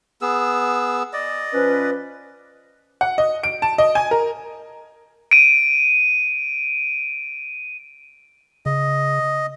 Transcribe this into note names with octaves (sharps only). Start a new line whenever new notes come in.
B3 G#4 E6
D5 D#5
F3 C#4 B4
F#5
D#5
D7
A5
D#5
G#5
A#4
D7 D#7
C#3 D#5